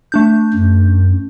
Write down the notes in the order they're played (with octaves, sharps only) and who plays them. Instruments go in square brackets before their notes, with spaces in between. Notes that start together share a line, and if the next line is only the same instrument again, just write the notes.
[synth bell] A3 D4 G6
[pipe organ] F#2